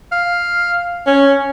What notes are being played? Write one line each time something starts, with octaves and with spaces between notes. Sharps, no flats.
F5
C#4